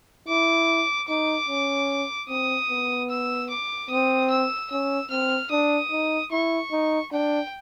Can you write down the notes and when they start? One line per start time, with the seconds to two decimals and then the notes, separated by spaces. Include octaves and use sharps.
0.28 E4 D6
1.08 D#4 D6
1.48 C#4
2.29 C4 D#6
2.70 B3
3.10 E6
3.50 D6
3.90 C4 D#6
4.30 E6
4.70 C#4 E6
5.10 C4 F6
5.51 D4 D#6
5.92 D#4
6.32 E4 C#6
6.71 D#4
7.12 D4 G5